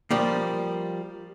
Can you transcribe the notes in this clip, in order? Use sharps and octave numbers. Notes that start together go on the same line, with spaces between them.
F3 G3 A#3